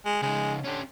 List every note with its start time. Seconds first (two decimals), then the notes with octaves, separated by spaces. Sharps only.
0.06 G#3
0.23 C#3 G#3 D#4
0.64 D3 C#4 G4